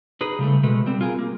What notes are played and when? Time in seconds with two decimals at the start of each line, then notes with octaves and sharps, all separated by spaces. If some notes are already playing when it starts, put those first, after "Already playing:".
0.21 D#4 G#4 B4
0.39 C#3 G3 A3
0.63 B2 G#3 A3 B4
0.86 G3 C4
1.01 F4 G#4 A#4
1.19 A#3